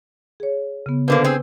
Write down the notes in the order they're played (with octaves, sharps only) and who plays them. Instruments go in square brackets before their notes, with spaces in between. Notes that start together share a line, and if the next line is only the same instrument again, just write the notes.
[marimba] G#4 C#5
C#3 B3
[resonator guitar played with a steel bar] B2 D3 A#3 [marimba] B4 C5 D6
[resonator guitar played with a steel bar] C4 G#4 [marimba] E6